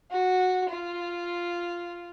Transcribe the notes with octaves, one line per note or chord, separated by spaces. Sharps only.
F#4
F4